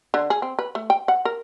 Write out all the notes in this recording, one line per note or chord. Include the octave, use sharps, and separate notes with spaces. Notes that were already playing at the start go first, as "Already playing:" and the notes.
D3
G#4
C4
B4
A3
G5
F#5
A#4